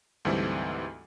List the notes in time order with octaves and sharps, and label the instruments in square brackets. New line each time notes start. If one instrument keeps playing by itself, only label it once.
[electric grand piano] D2 G#2 E3 G3 A3 C4